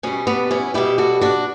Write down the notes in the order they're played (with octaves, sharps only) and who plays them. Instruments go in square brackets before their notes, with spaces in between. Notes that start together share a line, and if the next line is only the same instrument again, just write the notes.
[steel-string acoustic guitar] B2 G3 C#4
B3 D4
C#4 E4
B2 G3 E4 G4
F#4 A4
D4 F#4